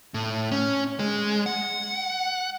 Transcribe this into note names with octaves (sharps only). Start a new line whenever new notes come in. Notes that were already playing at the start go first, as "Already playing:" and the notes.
A2
C#4
G#3
F#5